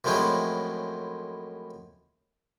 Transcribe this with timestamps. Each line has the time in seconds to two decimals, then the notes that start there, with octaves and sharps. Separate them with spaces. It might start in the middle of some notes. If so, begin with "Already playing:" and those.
0.04 F#2 A2 F3 G#3 C4 E4